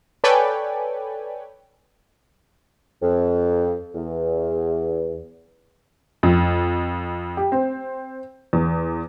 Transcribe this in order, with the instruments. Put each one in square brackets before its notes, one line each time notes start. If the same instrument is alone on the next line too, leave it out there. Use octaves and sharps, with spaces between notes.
[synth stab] A4 B4 C#5 D5 G5 G#5
[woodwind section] F2
E2
[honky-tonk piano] F2
G4
C4
E2